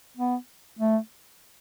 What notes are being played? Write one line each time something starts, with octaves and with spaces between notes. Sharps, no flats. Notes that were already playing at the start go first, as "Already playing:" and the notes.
B3
A3